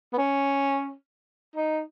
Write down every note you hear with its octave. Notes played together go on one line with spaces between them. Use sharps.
B3
C#4
D#4